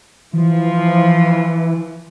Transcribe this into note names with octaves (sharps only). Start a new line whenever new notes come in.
E3 F3